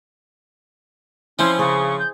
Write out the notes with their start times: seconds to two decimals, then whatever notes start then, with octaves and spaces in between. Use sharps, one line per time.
1.39 F3 C4 C#4 E4 C5 C6
1.59 C#3 G#4 C#6
1.99 G6